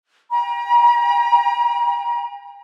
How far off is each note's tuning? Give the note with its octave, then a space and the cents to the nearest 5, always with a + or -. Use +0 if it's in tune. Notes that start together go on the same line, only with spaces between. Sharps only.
G5 +35 A#5 +40